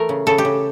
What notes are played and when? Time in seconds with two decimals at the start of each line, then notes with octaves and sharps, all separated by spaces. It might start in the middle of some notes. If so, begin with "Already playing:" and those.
Already playing: E3 A3 A#4
0.09 C#3
0.27 C#3 A4
0.38 G4
0.45 C#3